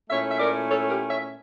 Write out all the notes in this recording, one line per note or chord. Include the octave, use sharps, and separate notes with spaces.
A#2 A3 C#4 E4 C#5 E5
E5
A#4 D5
A4 C#5
G4 A#4
C#5 E5